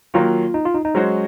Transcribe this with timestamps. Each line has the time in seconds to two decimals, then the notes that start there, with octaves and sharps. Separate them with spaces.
0.14 D#3 F#3 A#3 F4
0.54 D#4
0.65 F4
0.74 D#4
0.85 D#4
0.95 F#3 G#3 C#4 F#4 C5